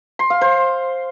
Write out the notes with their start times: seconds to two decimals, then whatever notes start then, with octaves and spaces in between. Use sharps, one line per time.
0.19 C6
0.30 F5
0.41 C5